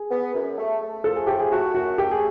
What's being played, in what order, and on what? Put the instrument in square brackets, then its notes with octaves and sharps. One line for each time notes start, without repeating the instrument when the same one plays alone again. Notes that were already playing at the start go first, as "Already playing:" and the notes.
Already playing: [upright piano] G#4
[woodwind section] B3
F#2
A3
A3
[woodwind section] F3 [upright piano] A4
[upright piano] G#4
[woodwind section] A2 [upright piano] G4
[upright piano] G#4
[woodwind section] A3 [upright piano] F#4
[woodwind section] F#2 [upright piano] F#4
[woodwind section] A3 [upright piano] G4
[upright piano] G#4